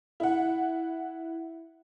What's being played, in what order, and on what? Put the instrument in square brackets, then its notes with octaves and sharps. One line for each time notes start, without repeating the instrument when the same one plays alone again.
[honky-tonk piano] E4 F#5